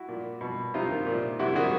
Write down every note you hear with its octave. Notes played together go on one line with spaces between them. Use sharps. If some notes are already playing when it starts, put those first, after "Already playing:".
Already playing: E4 F#4
A#2
B2
C3 D#4 F4
D#3
A#2
C3 E4 F#4
D#3 F#4 G#4